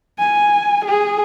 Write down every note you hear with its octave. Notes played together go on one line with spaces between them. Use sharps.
G#5
G#4